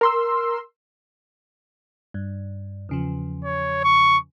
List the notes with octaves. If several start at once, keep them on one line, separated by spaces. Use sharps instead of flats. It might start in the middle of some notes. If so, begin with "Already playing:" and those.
A#4 C6 E6
G2
E2 C#3 F3
C#5
C#6